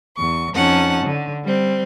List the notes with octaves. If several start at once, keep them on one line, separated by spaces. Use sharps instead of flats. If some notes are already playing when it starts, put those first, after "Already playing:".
E2 C#6
F2 C#4 D#4 F#5 A5
D3
G3 C4